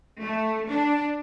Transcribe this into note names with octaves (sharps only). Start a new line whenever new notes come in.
A3
D4